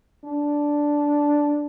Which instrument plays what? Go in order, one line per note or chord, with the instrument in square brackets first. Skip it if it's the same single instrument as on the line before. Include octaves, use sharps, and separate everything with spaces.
[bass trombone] D4